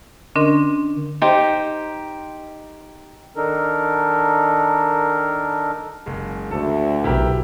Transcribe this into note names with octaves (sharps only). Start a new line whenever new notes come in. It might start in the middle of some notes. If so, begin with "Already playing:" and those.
D3 C#4 D4 A#4 D#5 C6
D#4 G4 C5
D#3 D4 D#4 A4 A#4
F#1 G#3
D2 A4
B1 E4 G4 A#4